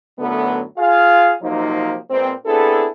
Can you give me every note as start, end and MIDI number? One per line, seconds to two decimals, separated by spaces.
0.19 0.63 42
0.19 0.63 45
0.19 0.63 50
0.19 0.63 54
0.19 0.63 57
0.19 0.63 59
0.78 1.33 65
0.78 1.33 68
0.78 1.33 77
1.43 1.97 48
1.43 1.97 53
1.43 1.97 54
1.43 1.97 58
1.43 1.97 63
2.10 2.32 46
2.10 2.32 56
2.10 2.32 59
2.10 2.32 60
2.46 2.87 59
2.46 2.87 60
2.46 2.87 62
2.46 2.87 64
2.46 2.87 68
2.46 2.87 69